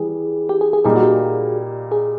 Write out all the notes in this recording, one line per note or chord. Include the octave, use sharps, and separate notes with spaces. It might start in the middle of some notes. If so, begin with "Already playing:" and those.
Already playing: E3 G3 G#4
G4
G#4
G#4
A#2 G3 A#3 D#4 G#4
F#4
G4
G#4